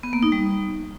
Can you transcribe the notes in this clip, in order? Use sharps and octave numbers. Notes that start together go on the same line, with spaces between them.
B3
A#3
D#4
G3